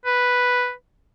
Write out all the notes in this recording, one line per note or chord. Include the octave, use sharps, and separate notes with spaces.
B4